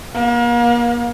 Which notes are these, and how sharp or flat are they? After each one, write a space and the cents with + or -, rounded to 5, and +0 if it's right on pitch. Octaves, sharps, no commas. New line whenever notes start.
A#3 +40